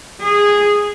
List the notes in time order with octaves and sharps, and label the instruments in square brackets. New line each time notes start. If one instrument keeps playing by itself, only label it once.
[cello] G#4